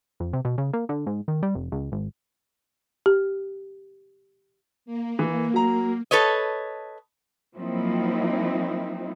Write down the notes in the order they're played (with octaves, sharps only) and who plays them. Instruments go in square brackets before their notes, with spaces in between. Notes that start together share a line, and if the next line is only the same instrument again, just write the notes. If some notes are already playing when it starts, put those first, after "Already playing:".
[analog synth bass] F2
C3
B2
C#3
A#3
D3
G#2
D#3
G3
F1
C#2
G#1
[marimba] G4
[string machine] A#3
[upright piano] E3
F#3 A#5
[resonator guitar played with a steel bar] A4 B4 C#5 D#5
[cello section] F3 F#3 A#3 C4 D#4 E4